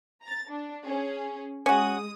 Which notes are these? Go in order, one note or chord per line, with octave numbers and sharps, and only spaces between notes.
A#5 A6
D4
C#4 G#4
G#3 C#4 F#4 D#6